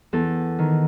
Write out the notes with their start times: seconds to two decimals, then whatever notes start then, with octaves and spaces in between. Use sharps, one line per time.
0.13 E2 A4
0.59 D#3